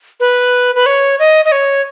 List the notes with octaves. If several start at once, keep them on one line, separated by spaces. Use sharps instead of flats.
B4
B4
C#5
D#5
D#5
C#5